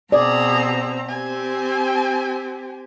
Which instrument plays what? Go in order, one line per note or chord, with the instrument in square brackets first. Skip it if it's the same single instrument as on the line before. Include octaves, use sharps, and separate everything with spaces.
[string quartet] B2 C4 A#5 [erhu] G#4 [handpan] D5
[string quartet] C4 G4 [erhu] G#5